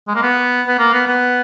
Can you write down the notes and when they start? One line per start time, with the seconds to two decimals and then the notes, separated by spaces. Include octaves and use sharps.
0.08 G#3
0.15 A#3
0.23 B3
0.67 B3
0.79 A#3
0.93 B3
1.07 B3